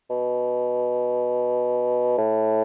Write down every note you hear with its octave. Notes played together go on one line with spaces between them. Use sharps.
B2
A2